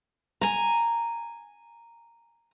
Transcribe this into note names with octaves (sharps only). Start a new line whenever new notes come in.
G#5 A#5